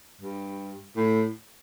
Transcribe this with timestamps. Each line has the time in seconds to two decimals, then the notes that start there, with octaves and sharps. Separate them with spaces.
0.21 G2
0.96 A2